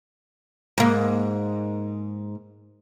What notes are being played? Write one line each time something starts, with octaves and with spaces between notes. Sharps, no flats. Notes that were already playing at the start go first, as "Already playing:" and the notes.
G#2 A#3